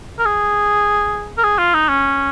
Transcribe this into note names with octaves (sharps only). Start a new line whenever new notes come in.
A#4
G#4
A#4
G#4
F4
D#4
C#4